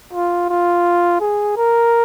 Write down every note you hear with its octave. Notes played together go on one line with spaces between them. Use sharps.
F4
F4
G#4
A#4